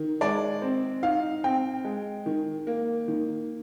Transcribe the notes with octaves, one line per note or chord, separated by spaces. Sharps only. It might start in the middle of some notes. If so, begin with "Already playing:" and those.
Already playing: D#3
G#3 D5
C4
D#4 F5
C4 G5
G#3
D#3
A#3
D#3